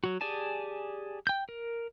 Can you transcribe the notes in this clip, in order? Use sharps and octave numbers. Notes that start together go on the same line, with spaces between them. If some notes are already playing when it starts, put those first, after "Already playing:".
F#3 F#4
G4 G#4 D5 G#5 A5
G5 G6
A#4